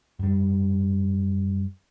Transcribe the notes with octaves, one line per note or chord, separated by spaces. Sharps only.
F#2 G3